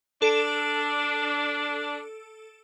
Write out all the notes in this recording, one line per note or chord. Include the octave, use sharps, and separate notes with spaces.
D4 A4 D7 E7